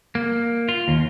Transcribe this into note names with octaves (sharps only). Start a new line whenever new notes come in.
A#3
F4
D#2